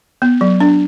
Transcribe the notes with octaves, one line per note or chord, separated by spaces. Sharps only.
B3
F#3
D4